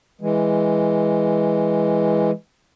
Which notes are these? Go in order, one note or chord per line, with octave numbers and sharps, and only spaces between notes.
E3 G#3